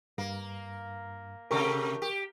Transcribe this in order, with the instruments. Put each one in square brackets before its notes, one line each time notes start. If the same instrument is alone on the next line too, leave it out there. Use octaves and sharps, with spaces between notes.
[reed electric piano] G2 [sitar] A#3
[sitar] C3 A3 G4 [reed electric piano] A#4 C#6
[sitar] G4